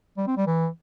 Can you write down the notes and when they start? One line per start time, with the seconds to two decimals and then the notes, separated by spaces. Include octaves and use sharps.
0.18 G3
0.27 C4
0.37 G3
0.47 E3